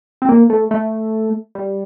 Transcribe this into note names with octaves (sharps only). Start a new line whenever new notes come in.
C4
A#3
A3
A3
G3